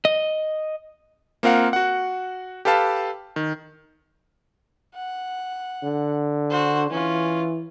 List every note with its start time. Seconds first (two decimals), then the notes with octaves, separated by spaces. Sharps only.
0.05 D#5
1.43 A#3 C4 F4 A#4 F5 F#5
1.73 F#4 F#5
2.65 G4 A4 B4 F5 A5
3.36 D#3
4.95 F#5
5.83 D3
6.50 F#4 C5
6.90 E3 C#4 F4